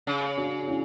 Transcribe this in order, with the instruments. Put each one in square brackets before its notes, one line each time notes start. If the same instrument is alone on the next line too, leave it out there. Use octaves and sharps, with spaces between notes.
[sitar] C#3
[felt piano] D4 F#4
C#4 E4